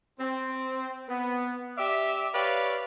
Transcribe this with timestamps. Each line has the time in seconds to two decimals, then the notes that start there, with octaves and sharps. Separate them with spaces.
0.19 C4
1.08 B3
1.77 G4 D5 E5
2.33 G4 B4 C#5 D5 F5